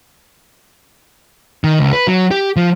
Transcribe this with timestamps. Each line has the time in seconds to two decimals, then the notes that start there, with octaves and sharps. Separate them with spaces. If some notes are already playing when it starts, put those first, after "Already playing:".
1.64 D#3
1.79 C#2
1.93 B4
2.07 F#3
2.31 G4
2.56 F3